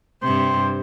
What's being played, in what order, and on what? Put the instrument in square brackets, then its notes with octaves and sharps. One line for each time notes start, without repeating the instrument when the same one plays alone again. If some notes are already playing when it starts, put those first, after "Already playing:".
[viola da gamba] G2 C3 [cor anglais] C5